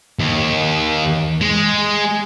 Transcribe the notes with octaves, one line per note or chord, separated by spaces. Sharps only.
D#2
G#3